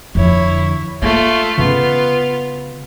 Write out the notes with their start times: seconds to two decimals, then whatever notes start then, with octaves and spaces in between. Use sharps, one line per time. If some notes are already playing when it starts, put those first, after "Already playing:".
0.15 F2 D3 E4 C#5
1.02 A3 A#3 F4
1.58 C#3 B3 F4